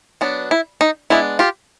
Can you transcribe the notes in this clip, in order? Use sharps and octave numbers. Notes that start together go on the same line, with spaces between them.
F#3 B3 D4
E4
D#4
G#3 B3 D4 E4
F4 G4